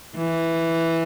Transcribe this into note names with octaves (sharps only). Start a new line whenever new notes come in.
E3